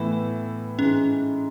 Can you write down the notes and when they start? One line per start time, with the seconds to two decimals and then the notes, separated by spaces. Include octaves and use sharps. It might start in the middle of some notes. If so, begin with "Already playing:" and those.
Already playing: A2 E3 B3 E4 B4
0.78 G#2 E3 G#3 C#4